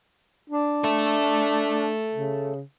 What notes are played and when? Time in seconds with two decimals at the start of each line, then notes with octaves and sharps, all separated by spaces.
0.50 D4
0.84 A4 E5
2.14 C#3